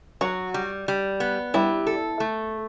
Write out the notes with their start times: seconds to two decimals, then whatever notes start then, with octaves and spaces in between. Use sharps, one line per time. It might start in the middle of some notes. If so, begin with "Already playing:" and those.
0.21 F#3 F#4
0.54 G3
0.88 G3
1.20 B3
1.54 G3 E4
1.87 A4
2.20 A3